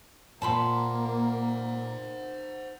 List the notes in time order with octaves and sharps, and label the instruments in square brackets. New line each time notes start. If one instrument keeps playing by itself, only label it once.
[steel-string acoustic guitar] A#2 [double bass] A#3 [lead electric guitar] C5 F#5 [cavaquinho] A5 B5 C6